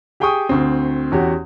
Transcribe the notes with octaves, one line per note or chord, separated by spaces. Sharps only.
G4 G#4 G5 G#5 C#6 D#6
D2 C4
E2 C#4 F#4 G4